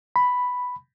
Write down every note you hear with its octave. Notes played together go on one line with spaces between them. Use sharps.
B5